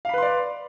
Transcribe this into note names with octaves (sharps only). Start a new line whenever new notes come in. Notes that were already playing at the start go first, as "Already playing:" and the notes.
B4 D5 F5 B5 C6